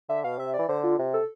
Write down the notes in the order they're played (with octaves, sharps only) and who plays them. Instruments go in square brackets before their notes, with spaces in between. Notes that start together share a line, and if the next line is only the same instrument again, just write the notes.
[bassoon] D3 [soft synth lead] E5
[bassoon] B2 [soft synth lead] F5
[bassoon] C3 [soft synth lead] E5
[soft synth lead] D5
[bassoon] E3
[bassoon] D3 [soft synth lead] C5
[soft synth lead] F4
[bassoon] C3
[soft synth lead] A4